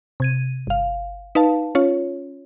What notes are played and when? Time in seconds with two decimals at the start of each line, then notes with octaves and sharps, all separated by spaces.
0.20 C3 G#6 D#7
0.67 G1 F5
1.35 D#4 B4 F5 A5
1.75 C#4 F4 C#5